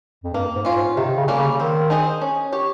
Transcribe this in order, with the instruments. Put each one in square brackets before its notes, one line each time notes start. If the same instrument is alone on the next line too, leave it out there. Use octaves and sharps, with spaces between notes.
[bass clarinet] F2
[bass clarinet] G2 [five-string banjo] A#3
[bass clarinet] G#2
[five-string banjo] C#4 F4
[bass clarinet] G#2
[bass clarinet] C3 [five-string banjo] D#3
[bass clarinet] C#3
[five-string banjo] G3 A#3 C#4
[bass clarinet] C#3
[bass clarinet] D#3 [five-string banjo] C4
[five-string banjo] D#4 G#4 C5 D#5
C#4
G4 C#5